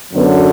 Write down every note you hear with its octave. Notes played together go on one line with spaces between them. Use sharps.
F#2 D3 F#3 B3